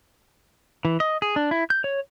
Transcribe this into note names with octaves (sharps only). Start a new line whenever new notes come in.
E3
D#5
G#4
D4
E4
G6
C#5